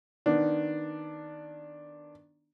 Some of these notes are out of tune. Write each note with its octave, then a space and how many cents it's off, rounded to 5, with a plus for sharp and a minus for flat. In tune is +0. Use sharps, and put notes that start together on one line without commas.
D#3 +0 B3 +0 D4 +5